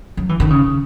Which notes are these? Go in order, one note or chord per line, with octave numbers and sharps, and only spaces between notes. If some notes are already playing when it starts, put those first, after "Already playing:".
F#3
E3
D#3
C#3